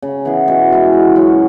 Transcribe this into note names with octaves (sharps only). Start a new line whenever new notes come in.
C#3
E3 B3 G#4
B2
G#3 E4 G#4
C#3
F#3 C#4 F#4